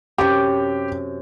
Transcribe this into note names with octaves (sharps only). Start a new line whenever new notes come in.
F#2 C3 G4